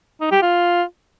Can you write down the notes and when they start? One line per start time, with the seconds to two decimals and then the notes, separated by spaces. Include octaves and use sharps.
0.21 D#4
0.31 G4
0.42 F4